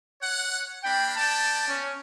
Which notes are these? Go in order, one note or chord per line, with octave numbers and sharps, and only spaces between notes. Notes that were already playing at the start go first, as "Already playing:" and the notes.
C#5 F#5
A#3 D4 G5 B5
B3 D5 G5 A5
C#4